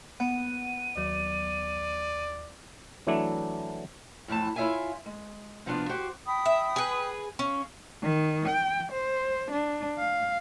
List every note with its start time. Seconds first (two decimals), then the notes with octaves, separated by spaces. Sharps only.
0.20 B3 F#5 D#7
0.97 D#2 F#3 D5
3.07 E3 F#3 A3 D4 E4
4.28 F2 A2 E3 A5
4.56 E4 F4 C#5 E5 F5 G#5
5.06 G#3
5.66 C3 F3 B3 D4 F4
5.89 F#4 G4 C5
6.25 G5 B5 D#6
6.46 E5
6.76 G#4 B4
7.39 C#4 F5 C#6
8.02 D#3
8.49 G5
8.93 C5
9.52 D4
9.99 F5